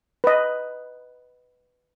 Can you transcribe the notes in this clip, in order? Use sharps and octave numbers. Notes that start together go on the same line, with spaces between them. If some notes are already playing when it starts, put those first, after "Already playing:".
B4 D#5